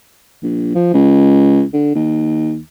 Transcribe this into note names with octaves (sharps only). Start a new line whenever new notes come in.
A#1
F3
C#2
D3
D#2